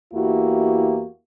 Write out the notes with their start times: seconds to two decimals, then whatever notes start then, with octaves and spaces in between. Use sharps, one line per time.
0.14 E2 A#3 E4 F#4 G4